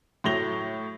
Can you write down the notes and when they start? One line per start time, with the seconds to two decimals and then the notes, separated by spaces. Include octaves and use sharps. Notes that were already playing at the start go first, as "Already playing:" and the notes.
0.24 A2 F#3 A3 A#6 F7 G7